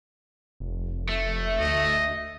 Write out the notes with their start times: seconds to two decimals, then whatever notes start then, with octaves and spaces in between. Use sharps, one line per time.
0.60 F1
1.09 A3 E5
1.60 D2 D#5